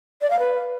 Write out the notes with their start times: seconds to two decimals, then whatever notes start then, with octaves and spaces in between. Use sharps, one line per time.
0.21 D5
0.30 F5
0.39 B4